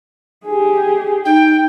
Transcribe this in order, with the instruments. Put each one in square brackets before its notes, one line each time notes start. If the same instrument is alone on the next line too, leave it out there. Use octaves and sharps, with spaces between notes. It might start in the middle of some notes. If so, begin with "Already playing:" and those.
[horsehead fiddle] G4 G#4
[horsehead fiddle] D#4 [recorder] G5